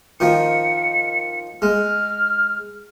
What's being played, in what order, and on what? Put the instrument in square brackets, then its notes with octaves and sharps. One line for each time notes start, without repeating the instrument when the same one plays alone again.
[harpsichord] D#3 F3 [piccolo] C#7
[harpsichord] G#3 [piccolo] F6